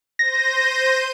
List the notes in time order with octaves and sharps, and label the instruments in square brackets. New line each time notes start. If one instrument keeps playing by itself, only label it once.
[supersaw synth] C5 G6 D#7 [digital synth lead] A#6